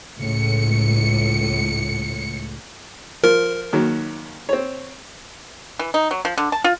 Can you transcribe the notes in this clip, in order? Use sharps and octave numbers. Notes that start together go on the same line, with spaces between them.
C#2 A2 C#7
F3 A#4
D#2 D#3 F#3
C4 C#5
E3
D#4
F#3
F3
D3
A5
F4